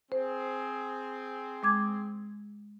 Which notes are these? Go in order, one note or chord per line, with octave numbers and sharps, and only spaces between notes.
C4 G#4 C5
G#3 D6 G#6